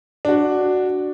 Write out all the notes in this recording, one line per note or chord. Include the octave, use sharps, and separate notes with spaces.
D4 F#4